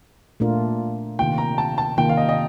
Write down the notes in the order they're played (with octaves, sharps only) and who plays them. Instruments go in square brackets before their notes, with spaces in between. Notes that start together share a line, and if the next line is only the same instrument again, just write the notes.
[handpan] A#2 A3 D4 F4 A#4
[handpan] C3 D#3 A#3 F4 [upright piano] G5
[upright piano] A#5
A5
A5
[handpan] C3 D#3 A#3 F4 [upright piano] G5
[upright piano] F5
D#5
D#5